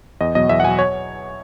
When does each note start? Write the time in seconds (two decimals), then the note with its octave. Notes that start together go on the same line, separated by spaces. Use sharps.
0.21 E2 D#5
0.35 B2 F#3 D#5
0.49 E2 E5
0.60 F#5
0.64 B2 F#3 G#5
0.79 C#5